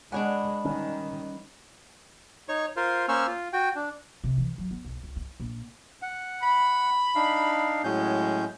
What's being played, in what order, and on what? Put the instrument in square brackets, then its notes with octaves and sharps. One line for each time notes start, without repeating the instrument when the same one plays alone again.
[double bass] G#3 [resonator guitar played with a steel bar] D4 C#5 G#5 [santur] B4 D5 F#5
[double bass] D#3 [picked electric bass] G3 C#4 [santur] A#4
[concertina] D#4 C#5 C#6
F4 A#4 C5
A#3 C#4 C5 C#6 E6 F6
F4
F#4 G5
D4
[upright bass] C3
E3
F#3
B3
B1
C#2
E4
A#1
[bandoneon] F#5
[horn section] B5
[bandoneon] D4 D#4 F5
[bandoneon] A2 C#4 G6 [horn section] F#3 G#3